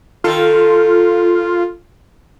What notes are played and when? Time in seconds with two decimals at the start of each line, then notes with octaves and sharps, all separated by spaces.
0.24 D#3 F4 A4